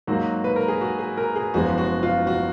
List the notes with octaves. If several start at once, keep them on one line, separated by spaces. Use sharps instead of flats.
G#2 F#3 A#3 F#4
B4
A#4
G#4
F#4
G#4
A#4
G#4
F#1 F#2 F3 G#3 B3 F#4
F#4
F4
F#4